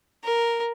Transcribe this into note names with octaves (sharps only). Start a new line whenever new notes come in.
A#4